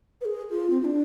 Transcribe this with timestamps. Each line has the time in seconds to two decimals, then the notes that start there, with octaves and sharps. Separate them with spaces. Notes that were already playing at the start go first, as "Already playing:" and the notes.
0.21 B4
0.25 G#4
0.51 F4
0.70 C4
0.81 F4
0.85 D4